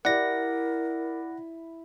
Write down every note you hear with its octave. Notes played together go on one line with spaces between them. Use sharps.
E4 G4 A#4 D5 F#5 A#6